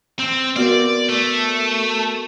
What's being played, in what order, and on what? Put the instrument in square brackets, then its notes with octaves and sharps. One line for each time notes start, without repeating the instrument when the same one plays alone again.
[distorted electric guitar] C4
[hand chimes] B3 F#4 A#4 [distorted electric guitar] D5
[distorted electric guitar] A3